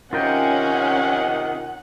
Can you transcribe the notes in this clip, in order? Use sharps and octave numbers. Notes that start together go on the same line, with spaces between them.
C3 D#3 C#4 F4 A#4 F#5 G5